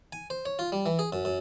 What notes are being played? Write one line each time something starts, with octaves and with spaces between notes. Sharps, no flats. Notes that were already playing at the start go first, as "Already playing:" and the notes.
G#5
C5
C#5
F4
G3
E3
G#4
F#2
F#2